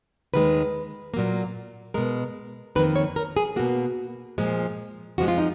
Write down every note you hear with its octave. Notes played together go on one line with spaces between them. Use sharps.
D#2 D#3 G#3 B4
A#2 F#3 A#3
B2 G#3 A#4
F2 D#3 A#3 B4
C#5
A#4
G#4
B2 A#3 F#4
A#2 F3 G#3
F2 F3 G#3 F#4
F4
D#4